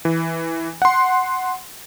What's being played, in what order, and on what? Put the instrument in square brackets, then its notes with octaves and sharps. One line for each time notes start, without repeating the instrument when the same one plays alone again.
[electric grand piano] E3
F#5 C6